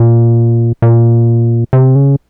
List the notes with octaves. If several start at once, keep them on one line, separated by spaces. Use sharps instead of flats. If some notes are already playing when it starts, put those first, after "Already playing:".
Already playing: A#2
A#2
C3
C#3